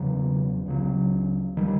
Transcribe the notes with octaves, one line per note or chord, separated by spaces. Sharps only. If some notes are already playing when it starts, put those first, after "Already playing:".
Already playing: E1 E2 C#3 F#3
C#2 C#3 F#3
D#3 G3